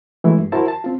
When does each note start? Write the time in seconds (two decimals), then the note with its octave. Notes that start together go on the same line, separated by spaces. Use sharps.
0.24 E3 F#3 G#3 A3 E4
0.38 G2
0.52 E4 F#4 A#4 C5 A5
0.68 A5
0.84 C4 F4